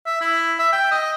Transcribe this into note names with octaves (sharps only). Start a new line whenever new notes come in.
E5
E4
E5
G5
D#5